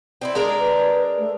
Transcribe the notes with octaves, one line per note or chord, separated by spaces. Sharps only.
C4 D#4 E4 D5
G#3 D4 A#4 D#5
B4
A3